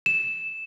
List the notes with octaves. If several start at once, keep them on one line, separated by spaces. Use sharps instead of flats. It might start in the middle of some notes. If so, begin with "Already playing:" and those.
E7